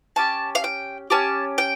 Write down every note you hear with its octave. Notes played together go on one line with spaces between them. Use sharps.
C#4 G4 A5
F5
G5
C#4 G4 A5
G5